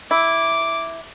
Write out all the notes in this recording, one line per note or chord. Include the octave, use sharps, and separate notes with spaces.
E4 D6